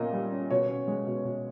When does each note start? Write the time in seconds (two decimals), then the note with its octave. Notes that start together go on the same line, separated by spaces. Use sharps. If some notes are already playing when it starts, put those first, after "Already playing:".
Already playing: A#2 A#3 C#4 D#5
0.13 G3
0.32 C#4
0.50 B2 C#5
0.69 C#4
0.88 G#3
1.07 B2
1.25 B2